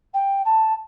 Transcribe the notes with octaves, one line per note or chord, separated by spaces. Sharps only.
G5
A5